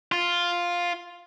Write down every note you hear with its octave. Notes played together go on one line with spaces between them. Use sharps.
F4